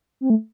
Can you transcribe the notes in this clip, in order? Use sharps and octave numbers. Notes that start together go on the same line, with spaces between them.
C4
A3